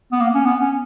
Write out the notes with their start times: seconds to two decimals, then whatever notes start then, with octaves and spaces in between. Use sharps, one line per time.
0.12 B3
0.21 A#3
0.34 C#4
0.46 B3
0.60 C#4